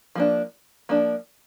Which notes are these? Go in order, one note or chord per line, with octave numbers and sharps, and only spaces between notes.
F3 A#3 D4
F3 A#3 D4